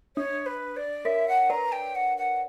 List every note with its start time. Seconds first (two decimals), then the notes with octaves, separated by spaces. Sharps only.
0.16 D4 C#5
0.46 B4
0.76 D5
1.05 A#4 C#5 E5
1.28 F#5
1.49 B4 D5 A#5
1.72 G5
1.95 F#5
2.17 F#5